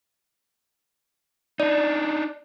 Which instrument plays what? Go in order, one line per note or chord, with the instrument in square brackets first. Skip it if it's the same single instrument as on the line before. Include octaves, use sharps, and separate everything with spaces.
[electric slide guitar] D4 D#4 [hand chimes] D5